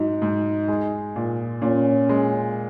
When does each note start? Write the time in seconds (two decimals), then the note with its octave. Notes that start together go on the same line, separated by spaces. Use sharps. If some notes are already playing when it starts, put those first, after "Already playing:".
Already playing: G#2 F#3 D#4
0.22 G#2
0.68 G#3
1.16 A#2
1.62 A#2 C#4
2.09 G#3